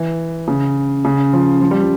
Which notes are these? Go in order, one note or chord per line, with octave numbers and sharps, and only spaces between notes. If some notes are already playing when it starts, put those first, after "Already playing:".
Already playing: E3
C#3
C#3
F3
F3
G3
F3